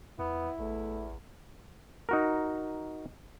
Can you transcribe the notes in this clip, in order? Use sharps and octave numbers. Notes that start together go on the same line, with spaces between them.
E2 B3 E4
A1 E2 A3
D#4 F#4 A#4